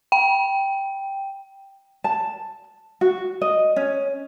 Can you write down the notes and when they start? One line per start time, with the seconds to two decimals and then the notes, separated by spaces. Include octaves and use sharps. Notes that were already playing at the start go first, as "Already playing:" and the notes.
0.12 G5
2.04 A5
3.01 F#4
3.42 D#5
3.76 C#4